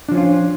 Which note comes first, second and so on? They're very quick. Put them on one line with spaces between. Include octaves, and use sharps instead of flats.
D4 F3 C#4 F4